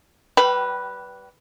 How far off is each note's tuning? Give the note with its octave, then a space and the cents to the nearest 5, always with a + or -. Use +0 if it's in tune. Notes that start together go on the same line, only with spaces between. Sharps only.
G3 -20 G4 -35 B4 +0